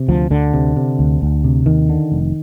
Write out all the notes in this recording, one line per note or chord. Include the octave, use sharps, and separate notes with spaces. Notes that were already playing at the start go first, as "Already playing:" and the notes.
Already playing: C3
D2 F3
D2 D3
C3
C3
D2
D2
C3
D#2 D#3
D3
F1